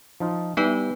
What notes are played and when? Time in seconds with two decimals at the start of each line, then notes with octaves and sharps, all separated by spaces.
0.20 F3 D#4 F4
0.57 G3 B3 D#4 E4 B4